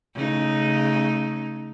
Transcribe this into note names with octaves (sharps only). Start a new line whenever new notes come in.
C#3 A3 D#4